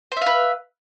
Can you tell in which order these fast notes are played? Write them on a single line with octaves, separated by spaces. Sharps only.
C5 E5 F5 B4